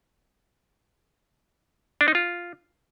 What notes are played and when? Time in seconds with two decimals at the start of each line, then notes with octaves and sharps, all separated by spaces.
2.01 D4
2.08 D#4
2.15 F4